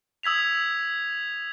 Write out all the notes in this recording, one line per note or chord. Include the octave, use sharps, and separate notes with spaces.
D#6 E6 G#6 B6 F7